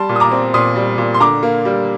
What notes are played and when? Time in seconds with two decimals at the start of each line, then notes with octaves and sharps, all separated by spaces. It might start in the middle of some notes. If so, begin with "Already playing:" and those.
Already playing: G3 A5 C6
0.09 A#2
0.16 D#6
0.20 A#5 D6
0.32 C4
0.54 A#2 C6 D#6
0.76 G3
0.98 A#2
1.14 C6
1.20 D3 A#5 D6
1.43 A#3
1.65 G3